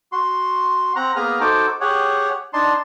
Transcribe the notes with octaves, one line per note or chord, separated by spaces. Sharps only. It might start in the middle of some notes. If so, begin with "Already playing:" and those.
F#4 C6
C4 F#5 A#5
A#3 B3 G#4 B4 A#5 F6
D#4 F#4 A4 C5 D6
G4 G#4 C#5 F#5
D4 D#4 A5 C6